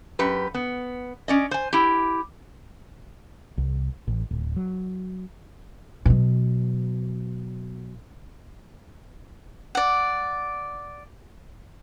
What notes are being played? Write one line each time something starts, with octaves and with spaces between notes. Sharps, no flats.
F#2 G4 B4
B3
C#4 D5 D#5
C5 G#5
E4 G4
C2
A1
D1
F#3
B2 F#3
D5 F#5